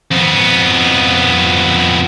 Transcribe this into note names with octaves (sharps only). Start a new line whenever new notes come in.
F2 B3